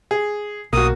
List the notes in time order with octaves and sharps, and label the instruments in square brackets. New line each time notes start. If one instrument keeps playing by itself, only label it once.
[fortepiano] G#4
[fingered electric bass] B1 [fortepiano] A#3 F#4 [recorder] D#6